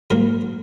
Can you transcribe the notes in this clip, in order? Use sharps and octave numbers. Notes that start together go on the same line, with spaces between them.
G#2 F#3 A#3 A#4